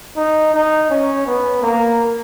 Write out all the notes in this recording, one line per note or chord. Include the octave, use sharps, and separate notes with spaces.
D#4
D#4
C#4
B3
A#3